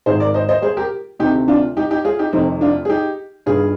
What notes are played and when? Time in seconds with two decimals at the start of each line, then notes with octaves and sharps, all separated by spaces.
0.06 G#1 G#2 D#3 G#4 C5
0.20 A#4 D5
0.34 C5 D#5
0.49 C5 D#5
0.62 G#4 C5
0.77 G4 A#4
1.19 D2 C3 D#3 D#4 G4
1.48 D4 F4
1.77 D#4 G4
1.90 D#4 G4
2.04 F4 G#4
2.19 D#4 G4
2.32 F1 F2 C3 D#3 C4 D#4
2.61 D4 F4
2.85 G#4
2.90 D#4 G4
3.46 G1 G2 D#3 F4 G#4